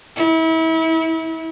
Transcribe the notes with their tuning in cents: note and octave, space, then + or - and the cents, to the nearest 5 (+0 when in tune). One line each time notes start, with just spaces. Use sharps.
E4 -30